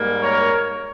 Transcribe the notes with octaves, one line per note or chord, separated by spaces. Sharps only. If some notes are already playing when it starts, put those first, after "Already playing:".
Already playing: G#2 G3 A#3
A#4 C#5